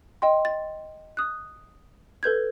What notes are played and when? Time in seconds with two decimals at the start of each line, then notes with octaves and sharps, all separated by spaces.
0.22 D#5 G5 C6
0.45 A6
1.17 D#6 F#6
2.23 A4 B4 G6 G#6